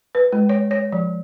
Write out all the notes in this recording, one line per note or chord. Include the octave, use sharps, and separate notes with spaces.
B4
G#3
C#5
C#5
F3